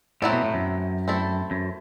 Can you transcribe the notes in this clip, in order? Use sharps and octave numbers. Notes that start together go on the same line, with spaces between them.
A2 F#3 C4 E4 A4
B2
A2
F#2
A3 C4 E4 A4
F#2